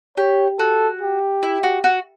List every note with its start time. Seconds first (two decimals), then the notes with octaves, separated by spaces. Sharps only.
0.17 G4 C#5
0.59 F#4 A4
1.01 G4
1.43 E4
1.63 F#4
1.84 F#4